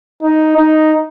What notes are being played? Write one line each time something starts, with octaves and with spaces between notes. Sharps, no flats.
D#4
D#4